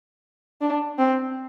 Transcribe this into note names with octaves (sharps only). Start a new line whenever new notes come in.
D4
C4